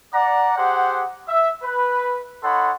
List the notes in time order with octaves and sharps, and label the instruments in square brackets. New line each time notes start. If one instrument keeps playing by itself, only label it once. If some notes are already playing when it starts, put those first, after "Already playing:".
[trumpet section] D5 F#5 A#5
G4 G#4 C5 F#5
E5
B4
D#4 A4 C#5 F#5 B5 C6